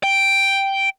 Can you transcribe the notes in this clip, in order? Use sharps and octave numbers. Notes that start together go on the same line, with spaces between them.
G5